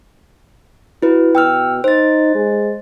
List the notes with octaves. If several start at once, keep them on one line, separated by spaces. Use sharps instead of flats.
E4 F#4 B4
B2 G5 E6 F6
D#4 C5 A6
G#3